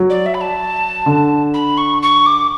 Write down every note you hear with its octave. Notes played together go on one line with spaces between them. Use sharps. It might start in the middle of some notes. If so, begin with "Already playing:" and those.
Already playing: F#3
D5
E5
B5
A5
D3
B5
C#6
C#6
D6